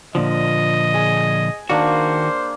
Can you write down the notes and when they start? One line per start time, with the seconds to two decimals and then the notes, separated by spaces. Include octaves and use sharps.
0.15 A#2 D3 F3 D#5
0.94 G#4
1.70 D#3 A#3 D4 F#4 C5